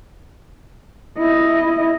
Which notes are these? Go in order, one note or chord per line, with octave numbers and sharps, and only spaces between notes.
E4 D#5